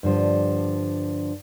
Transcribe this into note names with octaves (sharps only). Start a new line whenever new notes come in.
G2 D3 F3